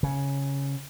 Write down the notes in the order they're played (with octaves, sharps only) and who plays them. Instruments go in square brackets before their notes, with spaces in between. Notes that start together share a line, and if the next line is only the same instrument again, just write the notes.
[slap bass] C#3